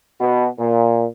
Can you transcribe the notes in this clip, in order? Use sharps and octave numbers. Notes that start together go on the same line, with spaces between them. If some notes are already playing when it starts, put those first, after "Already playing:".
B2
A#2